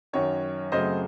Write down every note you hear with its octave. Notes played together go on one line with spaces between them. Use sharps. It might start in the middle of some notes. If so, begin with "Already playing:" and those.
F#2 D#3 F#3 C#4 C#5
F#2 C#3 F#3 A3 C4 C5 D#5